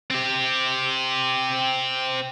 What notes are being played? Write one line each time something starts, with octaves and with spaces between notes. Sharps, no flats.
C4 G4